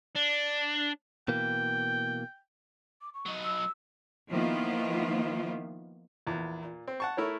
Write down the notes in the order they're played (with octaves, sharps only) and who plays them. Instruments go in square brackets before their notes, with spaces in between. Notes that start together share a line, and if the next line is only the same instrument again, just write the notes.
[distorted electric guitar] D4
[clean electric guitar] B2 E3 A#3 [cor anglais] G5
[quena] D6
C#6
[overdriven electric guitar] F#3 D#4
[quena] E6
[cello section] D#3 F3 A#3 B3 E4 F4
[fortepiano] A#1 E2
A#2
C4
F#5 A5 C#6
A3 E4 A#4 C#5